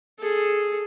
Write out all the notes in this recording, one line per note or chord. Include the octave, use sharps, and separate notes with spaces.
G#4 A4